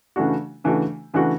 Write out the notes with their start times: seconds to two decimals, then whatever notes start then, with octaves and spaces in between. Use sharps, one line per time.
0.16 C#3 E3 A3 D4 F#4
0.64 C#3 E3 A3 D4 F#4
1.14 C#3 E3 A3 D4 F#4